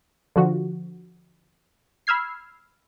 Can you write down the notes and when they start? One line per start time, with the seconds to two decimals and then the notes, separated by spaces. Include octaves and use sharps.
0.36 D3 F3 F#4
2.07 B5 E6 F6 G#6 C7